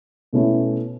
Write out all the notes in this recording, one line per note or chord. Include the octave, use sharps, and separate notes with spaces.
B2 A3 C#4 E4